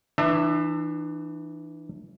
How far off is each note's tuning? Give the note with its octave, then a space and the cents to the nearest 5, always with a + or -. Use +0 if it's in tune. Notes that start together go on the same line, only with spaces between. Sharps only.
E3 +0 D4 +40 E5 +0